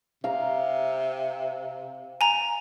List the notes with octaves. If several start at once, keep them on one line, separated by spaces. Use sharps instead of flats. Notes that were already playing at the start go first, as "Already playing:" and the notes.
C3 F5 A#5
G#5 A#5